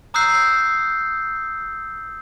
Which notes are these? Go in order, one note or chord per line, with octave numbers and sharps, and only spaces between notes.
A#5 D#6 E6 F#6 G6 C7